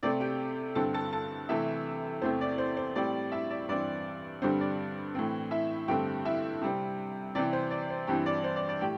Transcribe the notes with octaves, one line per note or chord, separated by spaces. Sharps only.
C3 A3 C4 D5
G4 G5
G2 D3 C4 A4 A5
A4 A5
A4 A5
C3 E3 A3 E4 E5
E2 C3 A3 C4 C5
D5
C5
C5
A2 G3 C4 D5
E4 E5
D5
G2 E3 C4 D5
G2 D3 G3 C4 C5
D5
A2 E3 C4
E4 E5
G2 D3 A3 C4 G4 G5
E4 E5
C3 G3 C4
C3 E3 C4 D5
C5
D5
C5
G2 E3 G3 C4 G4 G5
D5
C5
D5
D5
A2 G4 G5